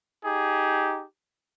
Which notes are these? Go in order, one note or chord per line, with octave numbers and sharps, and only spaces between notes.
D#4 G4 G#4